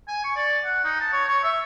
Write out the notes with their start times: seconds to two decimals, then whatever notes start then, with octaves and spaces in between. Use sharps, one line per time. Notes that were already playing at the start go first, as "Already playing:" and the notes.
0.08 G#5
0.24 C#6
0.36 D5
0.65 F#5
0.84 D#4
1.00 A5
1.12 C#5
1.28 C#5
1.43 E5